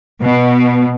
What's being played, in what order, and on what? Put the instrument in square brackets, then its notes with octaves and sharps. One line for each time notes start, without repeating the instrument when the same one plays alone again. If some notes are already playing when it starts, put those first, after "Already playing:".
[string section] B2